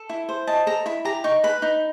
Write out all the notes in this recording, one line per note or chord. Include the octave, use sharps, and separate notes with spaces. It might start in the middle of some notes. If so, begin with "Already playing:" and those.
Already playing: A4
E4
C5
D#5 A5
A4 A#5
E4 B5
G4 A#5
D#4 C#6
B4 B5
D#4